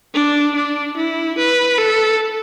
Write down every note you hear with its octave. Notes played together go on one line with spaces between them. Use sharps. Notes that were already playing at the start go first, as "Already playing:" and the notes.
D4
D4
E4
B4
A4